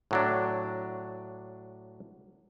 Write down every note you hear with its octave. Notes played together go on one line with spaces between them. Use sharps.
A2 F#3 D4